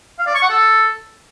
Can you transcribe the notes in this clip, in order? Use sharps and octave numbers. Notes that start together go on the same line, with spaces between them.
F5
D5
C#6
F#5
A4